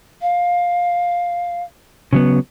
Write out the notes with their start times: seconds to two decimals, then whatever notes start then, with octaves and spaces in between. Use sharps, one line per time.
0.22 F5
2.13 C#3 F#3 B3